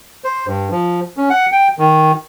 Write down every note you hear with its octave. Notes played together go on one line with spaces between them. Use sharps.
C5
G2
F3
C#4
F#5
G5
D#3